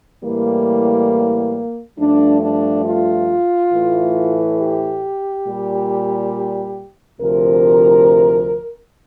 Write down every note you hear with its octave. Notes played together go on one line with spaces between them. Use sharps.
A2 E3 G3 A#3
G2 F3 A3 D4
D4
F4
A2 E3 A3
G4
A#2 G3
D2 C3 F3 A#4